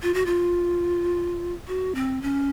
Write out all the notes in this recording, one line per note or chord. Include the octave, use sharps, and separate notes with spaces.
F4
F#4
F4
F#4
C4
C#4